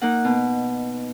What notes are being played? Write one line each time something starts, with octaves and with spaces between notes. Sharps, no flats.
A#3 D#4 F#5
B2